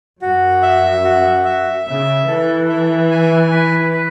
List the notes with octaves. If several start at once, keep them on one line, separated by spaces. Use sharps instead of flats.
F#2 F#4
E5
F#4
E5
C#3 E5
E3 A4
E5
G#5
B4
B4